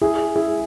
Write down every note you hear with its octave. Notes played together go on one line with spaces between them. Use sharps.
E4 G#4
E4 G#4